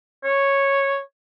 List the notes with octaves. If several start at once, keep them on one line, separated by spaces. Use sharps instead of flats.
C#5